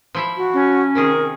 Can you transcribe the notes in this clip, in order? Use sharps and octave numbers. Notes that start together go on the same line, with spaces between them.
F3 E4 E5
F#4
C#4
C3 D#3 G#4 A#4